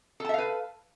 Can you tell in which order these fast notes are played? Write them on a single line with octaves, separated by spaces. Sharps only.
A4 A5 E5 F5 B4